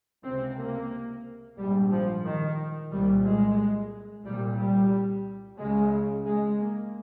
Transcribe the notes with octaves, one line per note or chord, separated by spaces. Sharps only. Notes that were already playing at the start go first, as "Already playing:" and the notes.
C#2 C3 C4
A#3
A#1 G#2 G3
F3
D#3
C2 A#2 G3
G#3
C2 A#2 G3
G3
C#2 C#3 G#3
G#3
A#3